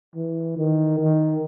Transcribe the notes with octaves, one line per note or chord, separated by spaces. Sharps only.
E3
D#3
D#3